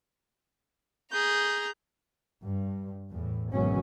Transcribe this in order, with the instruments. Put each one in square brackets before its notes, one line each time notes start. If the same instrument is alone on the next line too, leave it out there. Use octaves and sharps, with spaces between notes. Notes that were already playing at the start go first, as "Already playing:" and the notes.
[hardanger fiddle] G#4 A#5 [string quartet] G6
[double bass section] G2
E2 A2
G#1 E2 B2 F#3 C#4